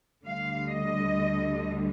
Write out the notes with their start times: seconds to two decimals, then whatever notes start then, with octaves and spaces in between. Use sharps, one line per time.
0.25 D2 D3 G3 F5
0.70 D#5